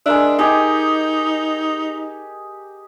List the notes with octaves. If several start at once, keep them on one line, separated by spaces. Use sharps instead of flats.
G#3 D4 A#4 E5
D#4 G4 G#4 D#5